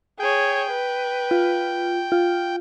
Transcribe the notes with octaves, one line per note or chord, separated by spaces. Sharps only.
G#4 C#5 G5
B4
F4
F4